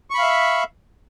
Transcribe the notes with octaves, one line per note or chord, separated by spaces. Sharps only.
E5 F5 B5 C#6